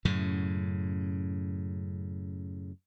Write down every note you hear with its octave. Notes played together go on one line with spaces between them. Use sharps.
F#2 A2 C#3